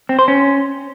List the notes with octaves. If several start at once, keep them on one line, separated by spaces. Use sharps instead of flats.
C4
C5
C#4